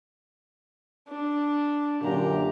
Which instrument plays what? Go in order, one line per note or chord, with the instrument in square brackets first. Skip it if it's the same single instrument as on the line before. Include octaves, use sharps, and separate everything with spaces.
[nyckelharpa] D4
[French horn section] F#2 A#2 D3 [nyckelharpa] G4 A#5